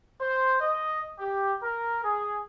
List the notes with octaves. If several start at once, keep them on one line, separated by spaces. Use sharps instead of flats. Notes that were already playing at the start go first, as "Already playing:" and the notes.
C5
D#5
G4
A#4
G#4